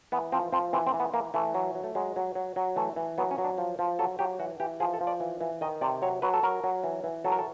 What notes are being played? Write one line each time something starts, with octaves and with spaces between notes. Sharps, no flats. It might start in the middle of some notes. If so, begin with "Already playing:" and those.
E3 B3
F3 C4
F3 C4
E3 C4
C4
E3
B3
E3 A#3
E3 A3
F#3
F#3
A3
F#3 G#3
F#3
F#3
F#3
E3 A3
E3
F#3 B3
C#4
F#3
D4
F3
F3
F#3 A4
F#3 G4
E3 F#4
E3 G4
F3 G#4
A4
F3
D5
E3
E3
D#3 D#5
C3 D5
F#3 C#5
F#3 B4
A4
F#3 A#4
F#3
E3
E3
F#3 A4
A#4
A4